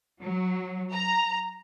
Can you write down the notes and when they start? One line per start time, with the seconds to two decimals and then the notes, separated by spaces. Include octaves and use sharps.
0.22 F#3
0.93 A#5